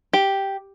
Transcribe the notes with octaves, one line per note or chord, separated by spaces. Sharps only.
G4